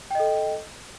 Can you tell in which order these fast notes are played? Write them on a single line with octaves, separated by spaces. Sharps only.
G5 D#5 A4